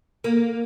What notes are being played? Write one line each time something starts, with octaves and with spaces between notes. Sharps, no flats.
A#3